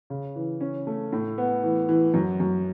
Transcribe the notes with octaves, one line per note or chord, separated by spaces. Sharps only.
C#3
E3
C#4
A3
A2
B3
E3
E3
F#2
F#2